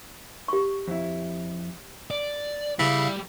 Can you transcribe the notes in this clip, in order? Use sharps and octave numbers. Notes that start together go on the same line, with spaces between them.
G4 C#6
F2 E4
D5
C#3 G3 E4 F5